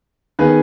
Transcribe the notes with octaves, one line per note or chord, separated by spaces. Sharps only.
D#3 B3 G#4 B4